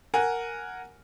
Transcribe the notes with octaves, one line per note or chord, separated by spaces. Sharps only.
A#4 F#5 G#5